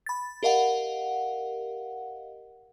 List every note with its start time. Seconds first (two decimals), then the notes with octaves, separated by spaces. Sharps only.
0.06 B5 A6
0.43 G4 A#4 D#5 F5 F#5